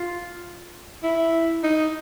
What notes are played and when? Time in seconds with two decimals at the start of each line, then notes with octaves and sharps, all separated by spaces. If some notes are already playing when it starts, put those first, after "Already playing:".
Already playing: F4
1.03 E4
1.63 D#4